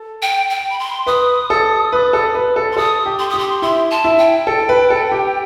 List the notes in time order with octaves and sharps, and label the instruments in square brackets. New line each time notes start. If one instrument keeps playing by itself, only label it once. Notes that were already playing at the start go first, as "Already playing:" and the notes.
Already playing: [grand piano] A4
[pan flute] G5
G5
B5
C6
[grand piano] B4 [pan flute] D#6
[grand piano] A4
B4
A4
B4
A4
[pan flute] C6
[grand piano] A4 [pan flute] D#6
[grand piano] G4
[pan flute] C6
[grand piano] G4 [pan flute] D#6
[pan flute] C6
[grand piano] E4 [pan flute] C6
[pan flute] A5
[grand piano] E4
[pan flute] G5
[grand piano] A4
B4
A4
G4